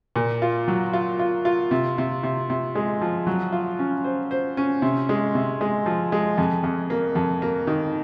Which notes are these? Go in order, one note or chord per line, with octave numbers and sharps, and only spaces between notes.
A#2
F4
F#3
F4
F4
F4
C3
C3
C3
C3
G#3
F3
F#3
F4
C#4
C5
C5
C#4
C3
G#3
C3
G#3
F3
G#3
F2
F2
A#3
F2
A#3
D#3